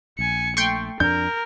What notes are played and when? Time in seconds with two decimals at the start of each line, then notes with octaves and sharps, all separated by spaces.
0.19 A#1 G#5 C#7
0.57 A3 G5 C6 C#6
1.00 F2 D4 A#4 G6